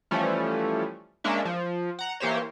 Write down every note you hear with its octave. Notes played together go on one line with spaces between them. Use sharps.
E3 F3 G3 A3 C#4
G#3 A#3 C#4 D4 E5
F3
F#5 A#5
E3 A#3 G4 C5 C#5